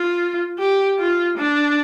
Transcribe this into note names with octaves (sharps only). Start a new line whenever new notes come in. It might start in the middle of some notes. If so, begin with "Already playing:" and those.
Already playing: F4
G4
F4
D4